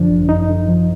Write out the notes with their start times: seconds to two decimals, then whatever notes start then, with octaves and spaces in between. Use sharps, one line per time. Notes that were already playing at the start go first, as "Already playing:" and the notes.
Already playing: F#2 D3 F3 D4
0.10 G#1
0.29 F#2 D#4
0.49 D3
0.68 F3